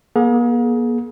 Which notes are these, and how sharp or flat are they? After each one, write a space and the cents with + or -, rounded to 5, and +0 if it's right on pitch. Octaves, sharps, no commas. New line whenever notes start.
A#3 +45 G#4 +25